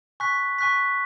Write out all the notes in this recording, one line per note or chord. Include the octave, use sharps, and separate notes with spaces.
G#5 C#6 F#6 B6
G#5 C#6 F#6 B6